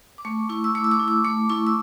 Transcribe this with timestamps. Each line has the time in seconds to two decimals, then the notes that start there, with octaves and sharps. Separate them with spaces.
0.18 D6
0.25 A3 C#6
0.49 E4 C#6
0.64 E6
0.75 A3 D6
0.84 E6
0.91 D6
1.00 E4
1.08 D6
1.24 A3 D6
1.49 E4 C#6
1.67 E6